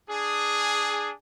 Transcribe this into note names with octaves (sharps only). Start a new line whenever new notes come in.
D4 G#4